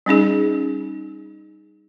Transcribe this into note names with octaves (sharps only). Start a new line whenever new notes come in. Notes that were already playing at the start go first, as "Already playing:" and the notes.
G3 C#4 D#4 G#4